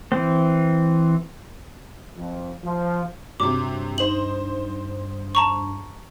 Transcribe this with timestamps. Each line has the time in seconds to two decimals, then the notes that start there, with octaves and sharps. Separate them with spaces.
0.12 E3 C4
2.17 F2
2.64 F3
3.40 G2 C3 F#3 D6
3.98 D#4 C5 F#7
5.35 A5 A#5 C#6